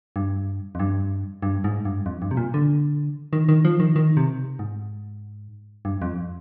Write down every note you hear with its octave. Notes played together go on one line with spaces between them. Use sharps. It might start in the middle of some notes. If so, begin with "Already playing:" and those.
G2
F2
G2
G2
G#2
G2
F2
G2
C3
A#2
D3
D#3
D#3
F3
D#3
D#3
C3
G#2
G2
F2